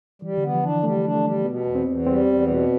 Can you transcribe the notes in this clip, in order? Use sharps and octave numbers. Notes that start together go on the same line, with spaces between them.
E3 G3
D3 B3
F3
E3 D4
G3 A3
D4
A3
G3
B2 B3
E2
C4
E2
G3 C4
E2
B2